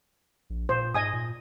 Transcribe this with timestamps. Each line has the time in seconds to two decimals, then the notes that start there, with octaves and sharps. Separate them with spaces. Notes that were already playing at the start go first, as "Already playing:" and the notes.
0.50 A#1
0.69 A#2 C5
0.94 G#2 D#5 G#5 D#6
1.13 A#2